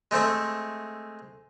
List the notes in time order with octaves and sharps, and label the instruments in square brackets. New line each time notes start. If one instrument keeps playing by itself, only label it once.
[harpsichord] G#3 A3 C4 E5